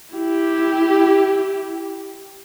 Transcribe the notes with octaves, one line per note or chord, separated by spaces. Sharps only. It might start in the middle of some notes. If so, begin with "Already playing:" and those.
E4 G4